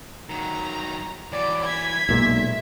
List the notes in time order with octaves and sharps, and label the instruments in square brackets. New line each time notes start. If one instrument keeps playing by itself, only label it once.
[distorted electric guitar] D#3 F#3 [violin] A#5
[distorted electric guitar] E3 F#3 [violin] D5
[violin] G#6 B6
[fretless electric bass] B1 A#2 G#3 [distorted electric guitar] E5